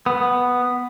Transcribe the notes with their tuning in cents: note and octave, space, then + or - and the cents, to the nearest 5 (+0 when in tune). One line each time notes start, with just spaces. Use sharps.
B3 +0